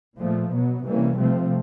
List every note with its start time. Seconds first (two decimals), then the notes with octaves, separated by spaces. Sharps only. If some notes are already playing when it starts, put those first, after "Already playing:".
0.18 A#2 F3 A3
0.52 B2 F#3 B3
0.83 C3 E3 G3 A#3 C#4
1.17 C3 F3 A3 C4